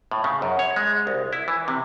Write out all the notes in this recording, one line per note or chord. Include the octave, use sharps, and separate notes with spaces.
A2
C#3
F#2
C#5
G#3
C2
E4
E3
C3